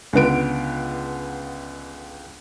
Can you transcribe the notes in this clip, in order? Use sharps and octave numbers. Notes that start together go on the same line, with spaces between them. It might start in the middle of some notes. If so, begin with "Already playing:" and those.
C#2 D3 B3 D7